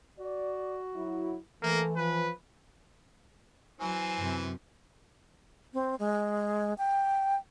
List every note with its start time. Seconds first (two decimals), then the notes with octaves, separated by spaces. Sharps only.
0.19 F#4 D5
0.95 F#3 E4
1.62 E3 A3 A#3
1.97 F3 B4
3.80 E3 F#3 C4 G#5
4.18 F#2 C3
5.74 C4
5.99 G#3
6.78 G5